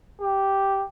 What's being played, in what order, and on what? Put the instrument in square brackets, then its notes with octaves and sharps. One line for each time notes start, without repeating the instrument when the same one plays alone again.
[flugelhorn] G4